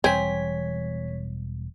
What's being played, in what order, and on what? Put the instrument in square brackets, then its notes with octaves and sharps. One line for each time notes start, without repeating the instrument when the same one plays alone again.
[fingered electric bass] E1 E2 G3 [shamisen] C4 [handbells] C#5 B6 [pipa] G#5